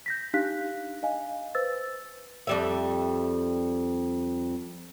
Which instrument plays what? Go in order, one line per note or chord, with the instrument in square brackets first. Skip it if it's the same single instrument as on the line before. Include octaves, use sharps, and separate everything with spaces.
[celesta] G6 A#6 B6
D4 D#4 G4 F5 F#6 B6
D#5 F5 G#5
B4 C5 E6 A6
[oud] F2 G3 E5